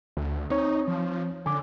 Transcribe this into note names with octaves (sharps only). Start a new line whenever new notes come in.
D2
C4 D#4 C#5
F3
D3 G#5 D6